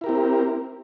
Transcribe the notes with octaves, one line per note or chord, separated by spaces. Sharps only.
C4 E4 G4 A#4